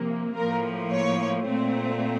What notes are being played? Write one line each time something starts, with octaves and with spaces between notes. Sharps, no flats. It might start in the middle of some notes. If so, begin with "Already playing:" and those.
Already playing: C3 F3 A#3
A2 F3 A#3 A#4
C#5
A#2 A3 C4